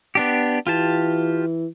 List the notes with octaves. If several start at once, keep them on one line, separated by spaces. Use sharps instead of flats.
B3 D4 G4
E3 F4 G4 A5